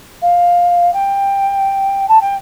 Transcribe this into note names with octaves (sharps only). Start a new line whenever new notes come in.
F5
G5
A5
G5